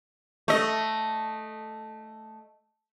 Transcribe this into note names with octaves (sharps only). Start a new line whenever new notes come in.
A3 D#5